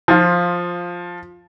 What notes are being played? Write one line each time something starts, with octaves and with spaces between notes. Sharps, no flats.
F3 F4